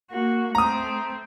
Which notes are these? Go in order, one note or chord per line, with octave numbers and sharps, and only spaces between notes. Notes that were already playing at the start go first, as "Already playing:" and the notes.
A#3 F#4
A3 C4 A#5 D#6